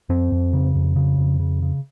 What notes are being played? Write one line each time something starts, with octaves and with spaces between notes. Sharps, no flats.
F2 C4
F2
C#3
F2
C#3
F2
C#3
C#3